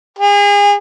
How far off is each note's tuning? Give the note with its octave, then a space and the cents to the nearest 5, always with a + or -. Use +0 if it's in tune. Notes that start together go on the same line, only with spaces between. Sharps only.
G#4 -35